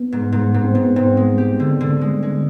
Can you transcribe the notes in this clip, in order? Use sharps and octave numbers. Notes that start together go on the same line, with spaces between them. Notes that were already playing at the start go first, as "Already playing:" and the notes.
Already playing: B3
G#2
G#2
G#2
C4
G#2 B3
G#2 C4
G#3
G4
D3
D3
G#3
G#3